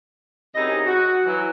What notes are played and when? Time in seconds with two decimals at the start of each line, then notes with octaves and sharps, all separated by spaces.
0.55 F#2 C3 D#4 E4 G#4 D#5
0.86 F#4
1.25 E3 F#3